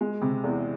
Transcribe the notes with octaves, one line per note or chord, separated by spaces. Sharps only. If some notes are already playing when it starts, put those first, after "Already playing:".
G#3
C3
E2